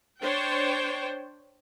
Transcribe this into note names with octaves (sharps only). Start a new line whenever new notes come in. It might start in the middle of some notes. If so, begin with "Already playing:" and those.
D4 C5 C#5 G5